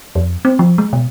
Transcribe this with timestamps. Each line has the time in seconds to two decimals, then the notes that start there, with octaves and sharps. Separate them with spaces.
0.15 F2
0.45 C4
0.59 F3
0.78 G#3
0.93 B2